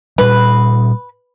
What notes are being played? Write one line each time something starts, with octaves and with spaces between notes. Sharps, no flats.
A#2 G3 B4